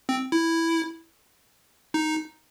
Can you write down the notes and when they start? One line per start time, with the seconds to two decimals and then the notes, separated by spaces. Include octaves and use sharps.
0.09 C4
0.32 E4
1.94 D#4